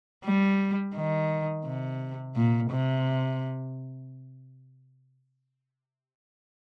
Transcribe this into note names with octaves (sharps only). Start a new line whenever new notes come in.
G3
D#3
C3
A#2
C3